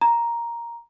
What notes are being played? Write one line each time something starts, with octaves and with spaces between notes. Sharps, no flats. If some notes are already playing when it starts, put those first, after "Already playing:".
A#5